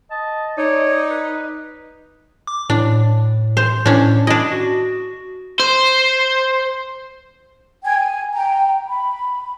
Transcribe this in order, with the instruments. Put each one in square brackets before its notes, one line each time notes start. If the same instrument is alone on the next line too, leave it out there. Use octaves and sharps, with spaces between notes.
[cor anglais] D#5 [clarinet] A5
[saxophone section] D#4 [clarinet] C#5 [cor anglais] D5
[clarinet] B4
[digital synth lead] D6
[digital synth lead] A2 [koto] D4
[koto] C5
[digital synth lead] A2 [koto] C#4 D4
[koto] D4 D#5 [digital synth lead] E4
[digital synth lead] F#4
[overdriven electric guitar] C5
[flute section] G5 G#5 G#6
G#5
G5 A#5
B5